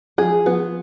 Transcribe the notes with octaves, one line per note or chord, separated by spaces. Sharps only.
F3 G#4
F3 B3